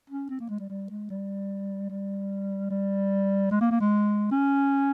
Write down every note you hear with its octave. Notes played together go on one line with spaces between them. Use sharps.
C#4
C4
A#3
G#3
G3
G3
G#3
G3
G3
G3
G#3
A#3
A#3
G#3
C#4